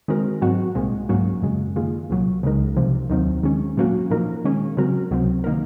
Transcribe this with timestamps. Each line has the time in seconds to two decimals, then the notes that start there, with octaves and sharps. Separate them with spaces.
0.08 D#3 G#3 C4 F#4 A#4
0.42 G#2 F#3 C4 D#4 F#4
0.75 C2 A#2 G#3 C4
1.09 G#2 F#3 A#3 C#4 F#4
1.42 F#2 C#3 G#3
1.76 D#3 A#3 F4 G#4
2.10 C2 A#2 F#3
2.43 C#2 C#3 G#3 D#4 A#4
2.76 C2 C3 F3
3.09 D#2 D#3 F#3 C4
3.43 D#3 G#3 C#4
3.77 A#2 F#3 A#3 C#4 F#4
4.10 A#2 F3 A#3 D#4 A#4
4.44 D#3 G#3 C#4
4.77 C#3 F#3 C4 F#4 A#4
5.11 C#2 C3 F#3 C4
5.44 D#3 A#3 D#4 A#4